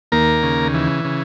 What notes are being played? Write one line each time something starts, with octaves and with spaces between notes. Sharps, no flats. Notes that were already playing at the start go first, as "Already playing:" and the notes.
D#2 A#3 A#4
C#3
E3
C#3